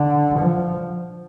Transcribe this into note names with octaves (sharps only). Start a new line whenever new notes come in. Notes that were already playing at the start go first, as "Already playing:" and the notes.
Already playing: D3
F3